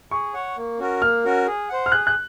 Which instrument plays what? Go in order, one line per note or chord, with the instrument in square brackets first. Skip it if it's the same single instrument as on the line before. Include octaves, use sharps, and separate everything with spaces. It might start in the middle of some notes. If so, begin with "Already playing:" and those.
[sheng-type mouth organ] G#4 [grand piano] C#6
[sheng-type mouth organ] C#5 F#5
A#3
C#4 F#4 A#4
[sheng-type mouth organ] A#3 [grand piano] F6
[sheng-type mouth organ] C#4 F#4 A#4
G#4
C5 F#5
[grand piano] F6
[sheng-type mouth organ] G#4 [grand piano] F#6
[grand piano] F#6